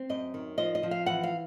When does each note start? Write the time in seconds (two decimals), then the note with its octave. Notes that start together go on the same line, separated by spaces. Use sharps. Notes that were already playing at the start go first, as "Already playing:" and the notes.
Already playing: C4
0.09 F#2 D#5
0.34 D#3
0.58 F3 D#5
0.75 D#5
0.83 F3
0.91 F5
1.06 E3 F#5
1.23 F5